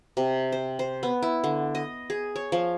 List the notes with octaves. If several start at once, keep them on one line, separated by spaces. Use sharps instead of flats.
C3
C5
C5
B3
E4
D3
D#5
G#4
C#5
F3